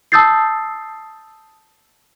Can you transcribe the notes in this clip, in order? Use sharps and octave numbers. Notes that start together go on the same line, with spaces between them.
A5 D#6 E6 G6 A6 C7